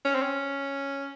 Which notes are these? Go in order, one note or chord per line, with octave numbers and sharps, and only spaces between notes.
C#4
C4
C#4